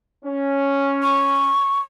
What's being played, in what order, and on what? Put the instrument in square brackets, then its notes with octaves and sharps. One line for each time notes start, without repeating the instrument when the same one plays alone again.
[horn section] C#4
[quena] C#6